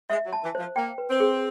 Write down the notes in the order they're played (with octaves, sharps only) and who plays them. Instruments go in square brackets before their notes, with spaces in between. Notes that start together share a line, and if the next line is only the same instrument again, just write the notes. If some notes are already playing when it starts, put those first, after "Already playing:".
[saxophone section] G#3 [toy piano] E5
[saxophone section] F#3
[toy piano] A5
[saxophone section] E3
[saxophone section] F3 [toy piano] C5
[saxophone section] A#3 [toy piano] G5
[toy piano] B4
[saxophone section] C4
[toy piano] G#4